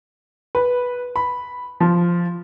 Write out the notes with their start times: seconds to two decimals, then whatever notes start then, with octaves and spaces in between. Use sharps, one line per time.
0.55 B4
1.16 B5
1.80 F3